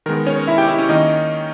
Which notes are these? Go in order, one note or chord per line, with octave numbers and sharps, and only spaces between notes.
D#3 G#3 B3 A#4
C#4 C#5
E4 E5
G4 G5
E4 E5
C#4 C#5
D#3 A#3 C#4 D#4 D#5